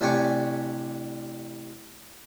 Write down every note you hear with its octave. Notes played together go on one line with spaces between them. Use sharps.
A1 C3 D4 G5 G#5 C#6